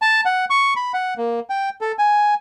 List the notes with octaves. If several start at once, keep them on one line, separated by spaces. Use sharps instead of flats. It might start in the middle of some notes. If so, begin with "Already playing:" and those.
A5
F#5
C#6
B5
F#5
A#3
G5
A4
G#5